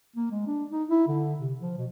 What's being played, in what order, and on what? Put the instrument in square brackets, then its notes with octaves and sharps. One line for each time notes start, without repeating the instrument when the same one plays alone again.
[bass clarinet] A#3
G#3
D4
D#4
E4
D3
C3
F3
B2